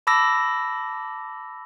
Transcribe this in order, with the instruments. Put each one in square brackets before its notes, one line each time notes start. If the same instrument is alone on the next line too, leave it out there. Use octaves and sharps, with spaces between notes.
[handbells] A5 B5 D6 E6 A#6